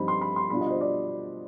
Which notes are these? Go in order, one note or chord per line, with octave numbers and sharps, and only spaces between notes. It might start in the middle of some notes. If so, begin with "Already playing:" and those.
Already playing: G2 F3 C4 D#4 B5
C6
B5
C6
B2 G3 D4 F4 B5
D#5
C5
D5